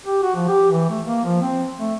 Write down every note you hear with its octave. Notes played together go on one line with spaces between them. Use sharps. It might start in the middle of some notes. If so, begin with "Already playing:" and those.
G4
F#4
F3
G4
E3
A3
A#3
F3
C4
A3